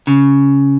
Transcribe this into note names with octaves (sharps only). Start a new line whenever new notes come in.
C#3